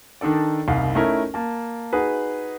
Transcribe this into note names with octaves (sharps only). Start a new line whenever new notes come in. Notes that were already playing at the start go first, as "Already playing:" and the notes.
D#3 D4 D#4 A4 D5
F#1 C2 D#4 F5
A3 C#4 D#4 E4 A#4
A#3 A5
D#4 F#4 G#4 B4